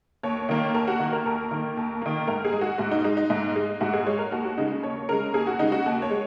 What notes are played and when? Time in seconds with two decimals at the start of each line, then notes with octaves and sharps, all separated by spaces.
0.23 D#2 C#5
0.49 D#3 A#3
0.74 D#2 A#4
0.87 F#4
1.00 D#3 A#3
1.13 A#4
1.26 D#2 A#4
1.51 D#3 A#3
1.77 D#2
2.01 D#3 A#3
2.27 G#2 A#4
2.45 G#4
2.53 G#3
2.61 F#4
2.78 G#2 F#4
2.91 D#4
3.04 G#3 D#4
3.17 D#4
3.30 G#2
3.56 G#3
3.81 G#2 F#4
3.93 G#4
4.06 G#3 C#5
4.18 A#4
4.32 D#2 F#4
4.44 F#4
4.58 C#3 G#3 D#4
4.83 D#2 C#5
5.09 C#3 G#3 A#4
5.33 D#2 G#4
5.47 F#4
5.59 C#3 G#3 D#4
5.72 F#4
5.86 D#2
6.02 C#5
6.10 G#3